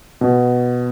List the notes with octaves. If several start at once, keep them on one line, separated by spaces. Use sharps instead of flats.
B2